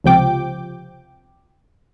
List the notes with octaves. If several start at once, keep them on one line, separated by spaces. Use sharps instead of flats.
C#2 C3 F3 G5 D6